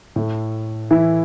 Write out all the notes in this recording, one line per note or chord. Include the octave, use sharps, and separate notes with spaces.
A2 A3
E3 E4